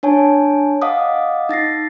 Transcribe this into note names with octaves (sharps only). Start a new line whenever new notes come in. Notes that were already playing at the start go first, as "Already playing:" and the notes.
D4 C#5 G#5 A5
D#5 F5 F#5 D6 D#6
D#4 A6 A#6 C7